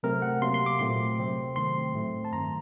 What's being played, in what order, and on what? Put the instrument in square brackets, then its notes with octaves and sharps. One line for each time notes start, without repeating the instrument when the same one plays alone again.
[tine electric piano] C3 F#3 A3 C4 A#4
F#5
C3 F#3 A#3 C6
C6
D6
A#2 A3 C4 C6
C3 F#3 C4
C3 D#3 A3 C4 C6
A2 F#3 A3 C4
A5
G2 D#3 F#3 A#5